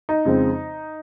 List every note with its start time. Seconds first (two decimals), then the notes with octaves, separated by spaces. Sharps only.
0.09 D#4
0.25 F2 C#3 G#3 C4